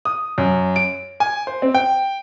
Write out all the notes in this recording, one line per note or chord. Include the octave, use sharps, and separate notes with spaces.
D#6
F#2
D7
G#5
C5
C4
G5